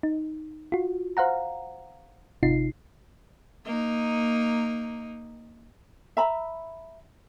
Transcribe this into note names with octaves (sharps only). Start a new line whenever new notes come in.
D#4
F4 F#4
C5 F5 F#5 A#5
G#1 C3 D#4 F4 C7
A#3 D#4
E5 A#5 B5